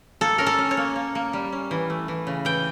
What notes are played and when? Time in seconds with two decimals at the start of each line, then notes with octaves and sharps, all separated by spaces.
0.21 A#3 A4
0.38 C#4 A#4
0.46 A4
0.58 C#4
0.71 C#5
0.77 A#3
0.96 A#3
1.15 A#3
1.33 G3
1.52 C#4
1.71 E3
1.90 A3
2.08 E3
2.27 C#3
2.45 E3 G5